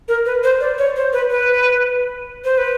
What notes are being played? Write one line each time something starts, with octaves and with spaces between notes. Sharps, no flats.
A#4
B4
C5
D5
C#5
C5
B4
B4
C5
B4